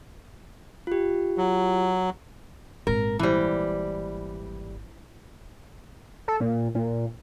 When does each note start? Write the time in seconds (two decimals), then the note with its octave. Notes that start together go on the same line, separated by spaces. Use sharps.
0.87 F4 G4
1.38 F#3
2.87 G#1 A#2 A#4
3.19 E3 G3 E4 C5
6.28 A4
6.40 A#2
6.75 A#2